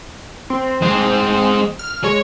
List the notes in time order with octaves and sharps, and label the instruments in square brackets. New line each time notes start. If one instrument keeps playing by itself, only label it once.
[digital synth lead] C4
[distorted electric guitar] G#3 C5
[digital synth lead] F6
[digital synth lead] G#3 [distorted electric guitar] C#5